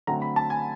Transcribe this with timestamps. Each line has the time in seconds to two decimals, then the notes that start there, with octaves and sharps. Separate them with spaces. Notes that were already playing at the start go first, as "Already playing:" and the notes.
0.07 D3 F#3 A3 C4 A#5
0.22 B5
0.36 A5
0.50 G#5